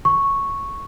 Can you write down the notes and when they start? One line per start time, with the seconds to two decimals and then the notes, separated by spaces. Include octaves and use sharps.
0.05 C#6